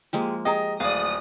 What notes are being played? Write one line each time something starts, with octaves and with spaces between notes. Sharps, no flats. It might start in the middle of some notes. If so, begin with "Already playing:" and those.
F3 G#3 A#3 G4 G#4
G4 G#4 D#5 A#5
D1 G#4 D5 F5 D#6